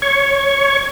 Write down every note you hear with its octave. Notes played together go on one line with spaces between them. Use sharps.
C#5 C#6